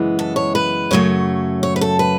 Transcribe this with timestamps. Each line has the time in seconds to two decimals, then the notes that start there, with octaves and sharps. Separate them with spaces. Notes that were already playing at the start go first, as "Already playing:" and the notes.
Already playing: F#2 C#3 E3 G#3 B3
0.19 A4
0.36 C#5
0.55 B4
0.91 F#2 C#3 F#3 A3 C#5
1.63 C#5
1.76 B4
1.81 A4
1.99 B4